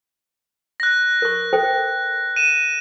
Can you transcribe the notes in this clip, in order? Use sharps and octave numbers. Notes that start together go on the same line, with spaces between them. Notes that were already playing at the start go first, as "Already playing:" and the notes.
F#6 A#6
A#4 C#6
A4 C5 G5
D#7 E7